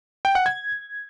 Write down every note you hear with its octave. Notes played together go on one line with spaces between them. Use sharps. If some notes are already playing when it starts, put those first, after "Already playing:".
G5
F#5
G#6